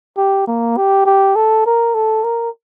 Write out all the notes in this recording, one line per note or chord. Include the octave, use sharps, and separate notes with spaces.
G4
A#3
G4
G4
A4
A#4
A4
A#4